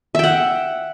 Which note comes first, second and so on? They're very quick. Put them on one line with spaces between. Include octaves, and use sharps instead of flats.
E5 G5 F#5